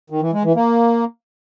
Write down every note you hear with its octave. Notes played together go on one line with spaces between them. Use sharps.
D#3
E3
G#3
E3
A#3